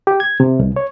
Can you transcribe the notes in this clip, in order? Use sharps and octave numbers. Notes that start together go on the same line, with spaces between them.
G4
G#6
C3
C2
C#5